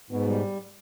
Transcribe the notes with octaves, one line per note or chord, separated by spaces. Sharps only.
G#2 B2
G3